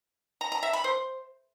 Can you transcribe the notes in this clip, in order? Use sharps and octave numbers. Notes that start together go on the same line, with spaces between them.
A#5
A#5
E5
B5
C5